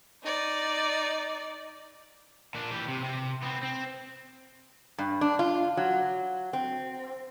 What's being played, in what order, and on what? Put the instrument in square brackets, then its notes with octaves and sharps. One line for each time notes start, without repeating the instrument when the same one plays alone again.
[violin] D#4 D5
[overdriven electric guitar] A#2 D4
E3 G4
C3
C3
B3 C4
C4
[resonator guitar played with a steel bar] G2
D4
F4
F#3
C4